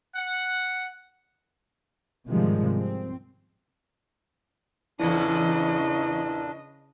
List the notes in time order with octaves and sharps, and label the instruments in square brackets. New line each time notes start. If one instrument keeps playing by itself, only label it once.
[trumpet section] F#5
[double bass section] G#2 C3 D#3 F3 G3 G#3
C4
[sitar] E2 A#2 [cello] C#3 D#5 [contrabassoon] E3 [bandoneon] D4